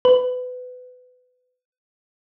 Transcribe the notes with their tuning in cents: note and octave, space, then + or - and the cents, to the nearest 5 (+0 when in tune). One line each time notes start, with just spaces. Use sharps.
B4 +25